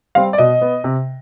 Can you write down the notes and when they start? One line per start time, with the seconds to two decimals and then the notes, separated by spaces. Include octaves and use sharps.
0.15 G3 C4 F5
0.33 D5
0.38 B2 D#5
0.61 B3
0.84 C3